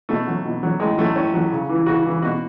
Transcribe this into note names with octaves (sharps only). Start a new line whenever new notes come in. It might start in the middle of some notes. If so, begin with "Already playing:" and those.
B2 A3
F#3
B2
F#3
A2 G#3
F#3 A3
A2 C#4
F#3
C#3
E3
C#3 F#4
E3
B2 F#4